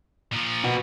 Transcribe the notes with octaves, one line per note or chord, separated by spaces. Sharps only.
A#2 F3
B3 F#4